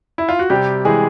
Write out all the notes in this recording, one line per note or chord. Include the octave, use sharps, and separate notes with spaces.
E4
F4
F#4
C3 G3 G4
E3 G#3 G#4